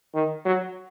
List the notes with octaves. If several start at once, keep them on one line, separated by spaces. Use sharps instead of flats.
D#3
F#3